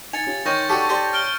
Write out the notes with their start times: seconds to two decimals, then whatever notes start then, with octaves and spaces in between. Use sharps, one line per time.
0.13 D#4 G#5 A6 C#7 F7
0.27 C#4 F4 G4
0.46 D#3 D#4 C#5 C6 C#6 G6 A#6
0.69 D4 F#4 G4 A4
0.89 G4 C5 D5
1.13 F6 D7 G7